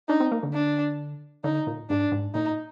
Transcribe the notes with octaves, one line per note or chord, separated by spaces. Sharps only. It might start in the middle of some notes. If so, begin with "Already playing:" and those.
D4 D#4
C4
A#3
D3
D4
D3 D#4
A#2
G#2 D4
G#2
A#2 D#4